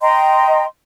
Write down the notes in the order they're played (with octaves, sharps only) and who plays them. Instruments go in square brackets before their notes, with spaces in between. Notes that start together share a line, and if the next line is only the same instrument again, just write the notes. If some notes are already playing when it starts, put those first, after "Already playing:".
[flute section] D#5 G5 A#5 C6